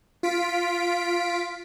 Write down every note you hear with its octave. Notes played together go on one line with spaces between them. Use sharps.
F4 B6 D7